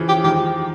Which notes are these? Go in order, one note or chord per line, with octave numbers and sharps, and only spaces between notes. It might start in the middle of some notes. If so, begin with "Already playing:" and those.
Already playing: C#3 E3 F3
G4
D#3 F3 G4